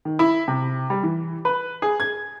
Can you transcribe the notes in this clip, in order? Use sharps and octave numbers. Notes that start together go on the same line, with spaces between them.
D#3
E4
C3
G3
E3
B4
G#4
G#6